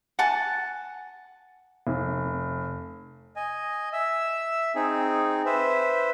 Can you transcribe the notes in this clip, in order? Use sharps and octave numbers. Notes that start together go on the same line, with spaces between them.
F#5 G#5 A5
F1
D#5 G#5
E5 E6
C4 D#4 G#4
B4 C5 E5